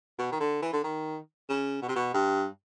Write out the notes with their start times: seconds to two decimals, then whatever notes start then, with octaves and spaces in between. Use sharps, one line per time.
0.19 B2
0.32 D#3
0.40 D3
0.62 E3
0.73 D3
0.84 D#3
1.49 C#3
1.82 B2
1.89 C3
1.96 B2
2.14 G2